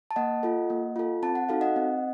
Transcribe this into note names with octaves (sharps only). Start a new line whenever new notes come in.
A5
A#3 D#5 F#5
F4 A4
A#3
F4 A4
C4 A5
F#5
D#4 F#4 A4 F5
D#5 F#5
C4